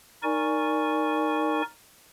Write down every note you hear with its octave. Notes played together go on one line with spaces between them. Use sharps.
D#4 A#4 D5 G#5 C#6